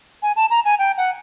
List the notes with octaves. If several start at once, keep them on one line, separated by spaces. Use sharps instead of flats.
G#5
A5
A#5
G#5
G5
F#5